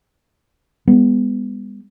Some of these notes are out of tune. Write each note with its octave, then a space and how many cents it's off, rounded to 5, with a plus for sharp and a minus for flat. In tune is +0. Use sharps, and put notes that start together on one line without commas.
G#3 -45 B3 +0